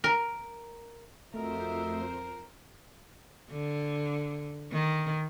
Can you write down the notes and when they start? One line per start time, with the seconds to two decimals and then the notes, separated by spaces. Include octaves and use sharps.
0.04 A#4
1.34 F2 F3 A3 F#4 A#4 C5 D#5 E5
3.51 D3
4.71 D#3